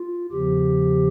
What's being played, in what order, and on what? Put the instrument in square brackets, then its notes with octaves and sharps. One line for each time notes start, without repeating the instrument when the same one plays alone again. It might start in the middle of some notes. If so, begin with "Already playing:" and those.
Already playing: [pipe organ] F4
E2 C#3 F3 G4